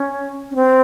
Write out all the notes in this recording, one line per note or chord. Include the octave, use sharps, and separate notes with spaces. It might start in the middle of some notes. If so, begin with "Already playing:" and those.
Already playing: C#4
C#4
C4